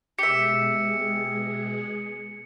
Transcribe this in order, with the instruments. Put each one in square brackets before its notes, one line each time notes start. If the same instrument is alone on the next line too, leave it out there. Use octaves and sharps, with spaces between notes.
[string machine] B2 G#3 G#4 [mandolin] G4 E5 [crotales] C#7